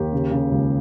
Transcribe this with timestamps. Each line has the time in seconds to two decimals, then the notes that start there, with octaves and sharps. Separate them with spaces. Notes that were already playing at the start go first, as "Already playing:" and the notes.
Already playing: D#2 G4
0.13 C#3
0.31 C#3
0.51 C#2